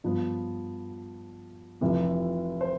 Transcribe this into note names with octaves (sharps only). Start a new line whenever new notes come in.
G2 F3 B3
F1 F2 C3 E3
C5